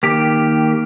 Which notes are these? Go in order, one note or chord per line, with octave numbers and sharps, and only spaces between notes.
D#3 A#3 G4